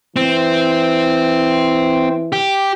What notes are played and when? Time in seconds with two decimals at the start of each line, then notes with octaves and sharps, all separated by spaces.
0.16 E3 C4
2.33 G4